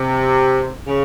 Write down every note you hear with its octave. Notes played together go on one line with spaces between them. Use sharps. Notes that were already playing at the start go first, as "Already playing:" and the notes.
Already playing: C3
C#3